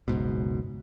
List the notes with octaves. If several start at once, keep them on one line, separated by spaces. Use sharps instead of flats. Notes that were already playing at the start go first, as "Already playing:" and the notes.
F#1 C#2 G#2 B2